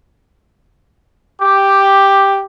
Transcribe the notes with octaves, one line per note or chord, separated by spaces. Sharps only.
G4